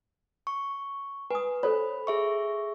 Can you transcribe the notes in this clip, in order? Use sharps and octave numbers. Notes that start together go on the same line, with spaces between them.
C#6
B4 G#5 D#6
A4 C5 C#5 B5
G#4 E5 C#6